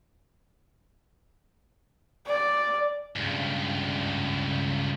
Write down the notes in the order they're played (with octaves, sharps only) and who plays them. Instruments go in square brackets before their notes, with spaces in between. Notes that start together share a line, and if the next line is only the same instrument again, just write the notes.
[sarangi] D5
[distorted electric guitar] C#2 G2